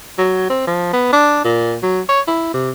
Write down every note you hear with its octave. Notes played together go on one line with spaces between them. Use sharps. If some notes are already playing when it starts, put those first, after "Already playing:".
F#3
C4
F3
B3
D4
A#2
F#3
C#5
E4
C3